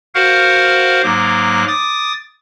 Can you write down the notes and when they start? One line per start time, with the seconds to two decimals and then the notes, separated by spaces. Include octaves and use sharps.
0.15 F#4 A#4 C5 F5 F#5
1.03 G#2 F#3 A#3 D6
1.68 D6 D#6 A6